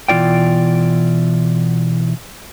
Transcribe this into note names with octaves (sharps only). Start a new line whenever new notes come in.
B2 E3 D#4 F4 D5 G5